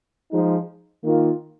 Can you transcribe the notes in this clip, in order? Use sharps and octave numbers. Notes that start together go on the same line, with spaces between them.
F3 G#3 D#4
D#3 A#3 F4